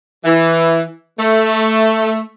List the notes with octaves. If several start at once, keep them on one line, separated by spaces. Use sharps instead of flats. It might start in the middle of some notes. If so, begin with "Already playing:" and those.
E3
A3